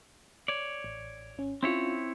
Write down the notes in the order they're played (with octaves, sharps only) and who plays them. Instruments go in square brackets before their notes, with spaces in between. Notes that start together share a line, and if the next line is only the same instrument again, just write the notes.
[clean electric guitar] C#5 D5
[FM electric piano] A1
G#1 C#4
[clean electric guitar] C4 E4 C#5 [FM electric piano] C#4 F4